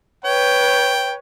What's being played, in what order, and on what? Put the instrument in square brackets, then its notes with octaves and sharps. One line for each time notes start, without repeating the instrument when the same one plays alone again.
[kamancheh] B4 C#5 [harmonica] G5